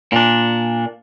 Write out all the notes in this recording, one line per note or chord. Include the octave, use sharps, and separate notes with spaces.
A#2 D4